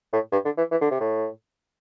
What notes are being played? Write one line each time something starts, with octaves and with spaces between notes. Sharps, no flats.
A2
G2
D3
E3
E3
D3
C3
A2